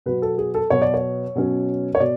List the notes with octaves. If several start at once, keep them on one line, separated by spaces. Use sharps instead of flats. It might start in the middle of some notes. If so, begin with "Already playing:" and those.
B2 F#3 B3 B4
A4
G#4
A4
B2 F#3 B3 C#5
D5
C#5
B2 F#3 C#4
C#5
B2 D5